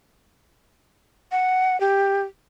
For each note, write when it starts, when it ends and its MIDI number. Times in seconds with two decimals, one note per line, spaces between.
1.32 1.79 78
1.80 2.23 67